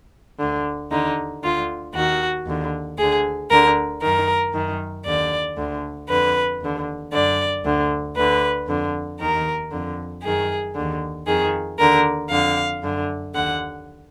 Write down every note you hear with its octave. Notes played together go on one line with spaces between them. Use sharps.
D2 D3
D#2 D3 D#4
D2 D3 F4
D#2 D#3 F#4
D#2 D3
D2 D3 G#4
D2 D3 A#4
F#2 D#3 A#4
F#2 D#3
D#2 D3 D5
D2 D3
F2 D3 B4
D#2 D3
F#2 D3 D5
D2 D3
D2 D3 B4
F2 D3
D#2 D#3 A#4
F2 D3
F#2 D#3 G#4
D#2 D3
F2 D#3 G#4
D#2 D3 A#4
F2 D3 F5
F#2 D3
D#2 D3 F#5